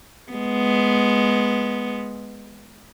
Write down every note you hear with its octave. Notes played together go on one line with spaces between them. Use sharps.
G#3 B3